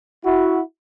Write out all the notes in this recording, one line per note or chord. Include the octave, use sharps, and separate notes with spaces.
E4 F#4